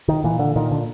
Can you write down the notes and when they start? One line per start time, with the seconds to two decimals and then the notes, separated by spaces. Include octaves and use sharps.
0.08 D#3
0.24 A#2 E3
0.39 D3
0.56 A#2 D#3
0.72 D3